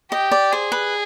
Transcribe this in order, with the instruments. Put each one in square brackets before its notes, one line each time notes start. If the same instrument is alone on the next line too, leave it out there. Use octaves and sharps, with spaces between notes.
[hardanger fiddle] G4 [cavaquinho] D#5
[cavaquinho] D5
[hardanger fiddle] G#4 [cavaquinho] C5
[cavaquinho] B4